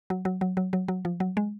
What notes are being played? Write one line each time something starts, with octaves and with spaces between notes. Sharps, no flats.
F#3
F#3
F#3
F#3
F#3
F#3
F3
F#3
G#3